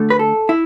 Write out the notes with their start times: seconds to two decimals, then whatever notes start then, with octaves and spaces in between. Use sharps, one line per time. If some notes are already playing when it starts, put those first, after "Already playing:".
Already playing: D2 D3 A3
0.10 B4
0.19 A4
0.49 E4